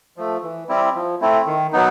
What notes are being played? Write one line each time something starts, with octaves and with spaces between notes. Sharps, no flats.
F3 A3
E3
G3 C4 E4 G4
F3
A3 C4 E4
D#3
F#3 B3 D#4